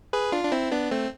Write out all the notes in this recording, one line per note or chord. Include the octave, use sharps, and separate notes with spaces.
G#4 B4
D4 F4
D4
C4 E4
B3 D4
A3 C4